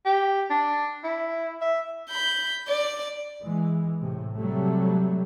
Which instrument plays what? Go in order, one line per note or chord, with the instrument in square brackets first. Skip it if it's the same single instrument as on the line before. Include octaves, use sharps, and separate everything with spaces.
[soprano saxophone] G4
D4
E4
E5
[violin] B5 G6
D5
[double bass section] E3 G#3
A2 C3
C3 F#3 G3 A3